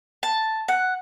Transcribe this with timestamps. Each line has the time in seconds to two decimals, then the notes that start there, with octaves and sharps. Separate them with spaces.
0.23 A5
0.68 F#5